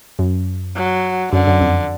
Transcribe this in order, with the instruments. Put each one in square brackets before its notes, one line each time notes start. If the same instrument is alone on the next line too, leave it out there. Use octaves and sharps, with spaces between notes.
[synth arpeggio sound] F#2
[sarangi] F#3
[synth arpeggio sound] F#2 [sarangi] D3
[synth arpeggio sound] F#2
F2